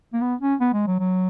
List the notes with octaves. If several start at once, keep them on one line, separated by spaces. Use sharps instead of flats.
A#3
B3
C#4
B3
G#3
F#3
F#3